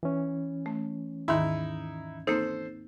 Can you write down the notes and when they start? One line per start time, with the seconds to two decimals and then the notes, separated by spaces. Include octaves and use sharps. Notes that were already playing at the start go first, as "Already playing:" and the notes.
0.03 E3 C#4
0.66 A3
1.28 D#2 G#2 D#3 D#4 E4
2.27 A#3 C4 D#4 A4 C5